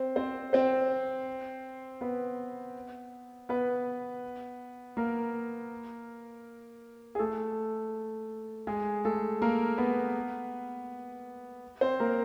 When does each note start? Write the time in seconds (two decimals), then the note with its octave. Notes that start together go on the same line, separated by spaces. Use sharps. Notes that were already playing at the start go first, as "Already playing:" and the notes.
Already playing: C4 C5
0.16 C4 C5
0.53 C4 C5
2.01 B3 B4
3.49 B3 B4
4.97 A#3 A#4
7.15 G#4
7.19 A3 A4
8.67 G#3 G#4
9.05 A3 A4
9.42 A#3 A#4
9.78 B3 B4
11.81 C4 C5
12.00 A#3 A#4